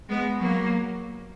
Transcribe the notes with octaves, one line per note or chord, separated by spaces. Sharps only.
G#3 B3
F#3 A#3